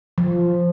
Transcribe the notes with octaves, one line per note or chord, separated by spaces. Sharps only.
F3